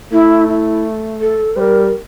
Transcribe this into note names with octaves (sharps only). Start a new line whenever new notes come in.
A3 E4
E4
A4
G3 A#4 C5